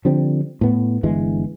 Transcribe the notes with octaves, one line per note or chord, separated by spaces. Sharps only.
D3 F3 G3 C4
A2 B3
G1 G2 E3 G#3